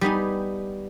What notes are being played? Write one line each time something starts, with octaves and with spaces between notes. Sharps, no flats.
G3 B3 D#4 G#5